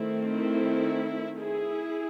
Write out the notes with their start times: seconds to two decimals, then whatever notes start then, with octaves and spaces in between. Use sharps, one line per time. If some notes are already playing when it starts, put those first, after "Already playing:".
Already playing: D#3 A3 C4 E4
0.32 E4
1.39 E4 G#4